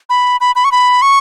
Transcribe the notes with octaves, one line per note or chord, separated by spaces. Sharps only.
B5
B5
B5
C#6
B5
C#6